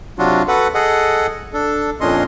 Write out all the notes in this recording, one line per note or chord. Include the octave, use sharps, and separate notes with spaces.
C3 F#3 D4 F4 F#4
F#4 A4 B4 F#5
G#4 A4 D#5 F#5
D4 A4
F2 A#2 C#4 D4 D#5 C6